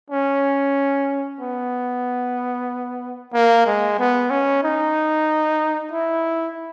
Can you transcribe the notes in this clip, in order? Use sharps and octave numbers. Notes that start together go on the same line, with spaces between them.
C#4
B3
A#3
G#3
B3
C#4
D#4
E4